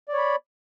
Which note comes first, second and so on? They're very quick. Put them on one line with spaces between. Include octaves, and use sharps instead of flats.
D5 C#5 B5